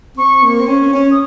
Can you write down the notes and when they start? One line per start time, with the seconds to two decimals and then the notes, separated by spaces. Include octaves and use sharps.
0.17 C4 C#6
0.44 A#3
0.60 C4
0.68 C#4
0.94 C#4
1.11 D#6